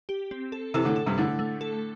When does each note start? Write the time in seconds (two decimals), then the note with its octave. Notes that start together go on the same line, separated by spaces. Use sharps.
0.09 G4
0.31 C4
0.52 A4
0.74 C3 E3 A4
0.85 A2 D3
0.96 A4
1.06 G2 C3
1.17 A2 D3 A3
1.39 A3
1.61 A4